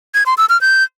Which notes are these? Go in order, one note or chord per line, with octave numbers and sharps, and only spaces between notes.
G#6
C6
E6
F6
G6